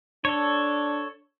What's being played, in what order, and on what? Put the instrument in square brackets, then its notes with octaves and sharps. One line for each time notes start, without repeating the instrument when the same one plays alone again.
[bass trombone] D4 [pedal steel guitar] A4 C#5